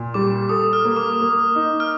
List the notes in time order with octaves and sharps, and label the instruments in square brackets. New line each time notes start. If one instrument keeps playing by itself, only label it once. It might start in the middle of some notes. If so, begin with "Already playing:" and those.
Already playing: [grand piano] A#2
[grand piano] G3 [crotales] D6
[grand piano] A4 [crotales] D#6
[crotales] F6
[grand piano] A#3
[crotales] D6
[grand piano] A#3
D#4
[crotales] F6